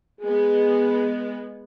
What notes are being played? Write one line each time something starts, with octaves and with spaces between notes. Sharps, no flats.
G#3 B3 G#4